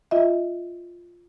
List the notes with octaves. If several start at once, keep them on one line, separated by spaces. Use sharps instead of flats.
F4 D#5 E5